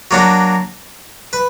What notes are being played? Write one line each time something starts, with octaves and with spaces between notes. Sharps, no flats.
F#3 A#3 D4 F#4
B4